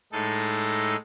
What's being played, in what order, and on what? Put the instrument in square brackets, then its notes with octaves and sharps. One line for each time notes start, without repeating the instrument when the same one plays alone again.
[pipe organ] A2 G#3 D#4 A4